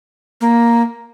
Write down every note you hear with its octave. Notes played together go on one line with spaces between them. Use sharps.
A#3